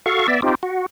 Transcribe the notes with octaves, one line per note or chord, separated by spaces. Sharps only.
F#4 A4 F5 C#6
B3 D5 E5
C4 D#4 F4 G4
F#4